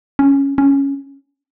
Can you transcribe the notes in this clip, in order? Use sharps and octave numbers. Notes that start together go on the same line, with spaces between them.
C#4
C#4